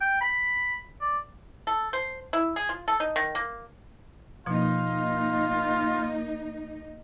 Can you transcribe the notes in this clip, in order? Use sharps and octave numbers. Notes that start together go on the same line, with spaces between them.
G5
B5
D5
A4
C5
E4
G#4
F4
A4
D#4
D#3
A#3
B2 F3 A#3 D#4 F4